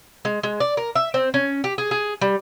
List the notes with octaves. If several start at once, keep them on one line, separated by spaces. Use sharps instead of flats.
G#3
G#3
D5
A#4
E5
C4
C#4
G4
G#4
G#4
G3